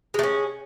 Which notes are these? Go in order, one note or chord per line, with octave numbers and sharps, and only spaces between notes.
G#3 A3 C#4